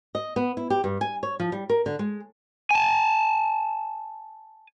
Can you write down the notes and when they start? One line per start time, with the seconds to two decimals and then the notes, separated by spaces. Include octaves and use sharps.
0.15 D#5
0.36 B3
0.57 E4
0.70 G4
0.84 G2
1.01 G#5
1.23 C#5
1.40 F3
1.52 G3
1.69 A#4
1.86 D3
1.99 G#3
2.71 G#5 A5